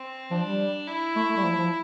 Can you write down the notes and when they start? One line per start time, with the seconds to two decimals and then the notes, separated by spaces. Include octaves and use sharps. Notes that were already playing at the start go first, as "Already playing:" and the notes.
Already playing: C4
0.31 F3 D4
0.45 G3
0.87 E4
1.16 A3
1.30 A3
1.37 G3
1.43 F3
1.58 F3